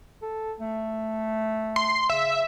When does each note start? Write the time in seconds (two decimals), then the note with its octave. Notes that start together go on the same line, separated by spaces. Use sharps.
0.22 A4
0.60 A3
1.76 C6
2.10 C#3 E5